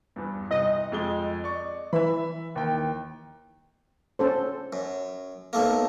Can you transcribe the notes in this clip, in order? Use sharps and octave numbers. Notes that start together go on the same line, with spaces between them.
E2 G2
C2 D#5
F2 G#3 G7
D5 C#6
E3 E5 B5
D#2 G5
C#4 A4 C5
F#2
B1 A3 A#3